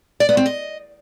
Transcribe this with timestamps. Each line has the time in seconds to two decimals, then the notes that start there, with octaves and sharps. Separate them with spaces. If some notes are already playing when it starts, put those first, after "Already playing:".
0.20 D5
0.29 B3
0.37 C4
0.46 D#5